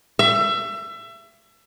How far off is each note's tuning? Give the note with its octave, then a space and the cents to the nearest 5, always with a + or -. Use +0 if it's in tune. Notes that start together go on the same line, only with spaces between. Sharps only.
E5 +30